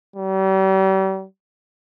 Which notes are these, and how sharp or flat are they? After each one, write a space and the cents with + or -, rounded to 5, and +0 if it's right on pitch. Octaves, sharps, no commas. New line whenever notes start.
G3 -40